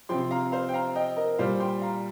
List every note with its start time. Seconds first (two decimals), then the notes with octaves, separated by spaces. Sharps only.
0.09 C3 F3 G5 C6
0.20 C6
0.31 F5 A#5
0.52 C5 F5
0.69 G5
0.74 F5 A#5
0.95 D#5 G5
1.16 A#4 D#5
1.39 A#2 G3 C5 F5
1.60 G5 C6
1.82 F5 A#5